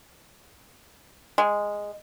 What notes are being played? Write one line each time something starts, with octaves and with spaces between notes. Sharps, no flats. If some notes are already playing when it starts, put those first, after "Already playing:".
G#3